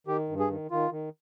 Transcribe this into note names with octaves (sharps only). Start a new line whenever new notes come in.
D#3 G4
G2
G#4
D#3
D#3 F4
D#3